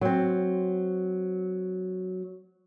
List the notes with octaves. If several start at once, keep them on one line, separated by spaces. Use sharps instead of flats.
F#3 C4